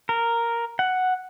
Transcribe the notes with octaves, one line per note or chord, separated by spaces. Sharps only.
A#4
F#5